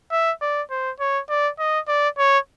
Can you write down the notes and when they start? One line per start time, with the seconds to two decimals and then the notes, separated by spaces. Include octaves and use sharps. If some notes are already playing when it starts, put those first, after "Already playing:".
0.12 E5
0.42 D5
0.71 C5
1.00 C#5
1.29 D5
1.59 D#5
1.88 D5
2.18 C#5